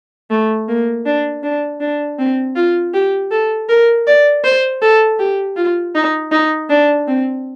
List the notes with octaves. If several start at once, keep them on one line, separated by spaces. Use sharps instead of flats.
A3
A#3
D4
D4
D4
C4
F4
G4
A4
A#4
D5
C5
A4
G4
F4
D#4
D#4
D4
C4